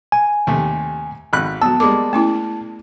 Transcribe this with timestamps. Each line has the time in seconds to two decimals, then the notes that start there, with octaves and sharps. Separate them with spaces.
0.12 G#5
0.47 D#2 C3 A3
1.33 G#1 B5 F#6
1.62 F#3 B3 A5 D#6 E6
1.80 G3 G#3 A#3 D6
2.13 A3 C#4 E4